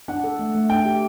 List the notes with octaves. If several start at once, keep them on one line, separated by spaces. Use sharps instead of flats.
D4 F#5
A4
A3
A3
D4 G5
G4